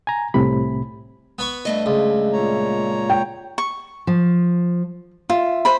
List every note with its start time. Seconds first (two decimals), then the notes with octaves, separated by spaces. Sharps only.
0.07 G#5 A#5
0.34 C2 A2 C3 B5
1.39 B3 B5 C#6
1.65 G2 A3 D#5
1.86 C#2
2.33 A#2 C#5 A#5
3.10 G5
3.58 C#6
4.07 F3
5.30 F4 E5
5.65 C5 B5